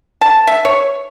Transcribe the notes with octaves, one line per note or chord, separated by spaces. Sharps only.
A5
E5
C#5